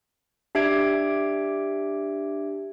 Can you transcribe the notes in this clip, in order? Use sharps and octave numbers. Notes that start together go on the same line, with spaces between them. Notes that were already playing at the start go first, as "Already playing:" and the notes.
D4 G4 E5 G#6 D7